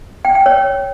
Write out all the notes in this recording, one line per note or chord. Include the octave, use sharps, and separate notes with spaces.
G5
G5
C#5